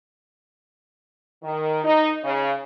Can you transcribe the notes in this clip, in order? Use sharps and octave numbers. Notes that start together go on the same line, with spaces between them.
D#3
D#4
C#3